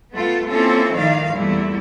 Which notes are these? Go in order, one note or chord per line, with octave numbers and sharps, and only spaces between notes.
A3 B3 F4
A#3 C4 C#4 E4 F4 A4
A2 D#3 F3 D5 F5
E2 A#2 G3 A3 E4